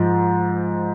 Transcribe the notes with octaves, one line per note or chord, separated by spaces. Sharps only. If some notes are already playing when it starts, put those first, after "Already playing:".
Already playing: G#2 F3